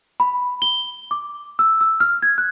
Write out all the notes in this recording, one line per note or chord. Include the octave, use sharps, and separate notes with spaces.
B5
G7
D6
E6
E6
F6
G#6
F#6